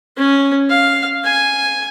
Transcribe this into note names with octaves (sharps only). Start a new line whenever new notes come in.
C#4
F5
G#5